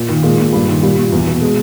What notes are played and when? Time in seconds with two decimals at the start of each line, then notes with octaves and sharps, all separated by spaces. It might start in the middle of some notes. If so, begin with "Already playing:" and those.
Already playing: A#2
0.09 D#3
0.23 A#2 G#3
0.38 A#2
0.53 G2
0.68 D#3
0.82 A#2 G3
0.97 A#2
1.12 E2
1.27 B2
1.41 G#3